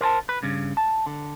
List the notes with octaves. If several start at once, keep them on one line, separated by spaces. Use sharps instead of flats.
A#4 C5 G#5 A5
B4
G2 C#3
A5
D3